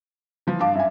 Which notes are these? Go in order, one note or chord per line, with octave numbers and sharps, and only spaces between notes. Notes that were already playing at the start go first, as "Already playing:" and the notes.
E3 F3
G2 F5 A5 D6
F#2 E5 G#5